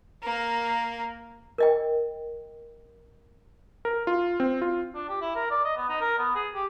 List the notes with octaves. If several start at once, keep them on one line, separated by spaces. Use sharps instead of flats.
A#3 A#4
A#4 D#5 G5
A#4
F4
C4
F4
D4
G4
E4
A#4
D5
D#5
B3
D#4
A#4
B3
G#4
G4